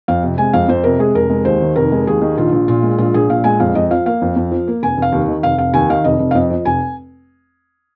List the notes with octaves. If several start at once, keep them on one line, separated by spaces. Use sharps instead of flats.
F2 F5
C3
G#3 G#5
F2 F5
F2 C5
C3 A#4
G#3 G#4
F1 A#4
G#3
D#2 C5
D#3
F1 A#4
G#3
D#2 G#4
D#3
A#1 F4
A#1
A#2 F4
G#3
A#1 F4
A#1 G#4
A#2 F5
G#3 G#5
F2 F5
F2 D#5
F3 F5
A#3 F5
F2
F2
F3
A#3
F1 G#5
F1 F5
D#2
D#3
F1 F5
F1 F5
D#2 G#5
D#3 F5
F1 D#5
F1
F5
F2 D#5
F3
F1 G#5